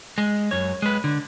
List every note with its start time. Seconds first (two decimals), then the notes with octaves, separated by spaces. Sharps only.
0.18 G#3
0.51 F#2 C#5
0.82 G#3 B4
1.04 D3